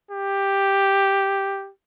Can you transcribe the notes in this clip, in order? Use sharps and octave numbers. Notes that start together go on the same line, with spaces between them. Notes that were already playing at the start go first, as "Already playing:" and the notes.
G4